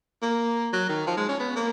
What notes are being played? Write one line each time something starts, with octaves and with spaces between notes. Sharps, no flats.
A#3
F#3
D#3
F3
G#3
C#4
B3
A#3